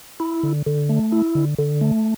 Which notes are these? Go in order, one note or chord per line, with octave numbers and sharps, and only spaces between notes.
E4
D3
D3
A3
E4
D3
D3
A3